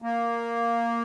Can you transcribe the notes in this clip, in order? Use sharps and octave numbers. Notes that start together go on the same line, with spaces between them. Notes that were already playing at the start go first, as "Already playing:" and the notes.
A#3